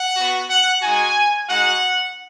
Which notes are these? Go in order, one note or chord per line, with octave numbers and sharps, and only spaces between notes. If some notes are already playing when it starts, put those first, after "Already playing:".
Already playing: F#5
B3 F#4
F#5
G#3 D#4 F#4 G#5
G#3 D#4 F#4 F#5